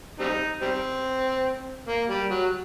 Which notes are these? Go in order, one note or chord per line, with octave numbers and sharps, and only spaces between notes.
G3 C4 D#4
G3 C4
A#3
G3
F#3